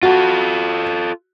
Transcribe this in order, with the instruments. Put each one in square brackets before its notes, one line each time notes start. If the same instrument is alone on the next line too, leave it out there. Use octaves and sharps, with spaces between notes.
[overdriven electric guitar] F4 A4 [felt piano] F#4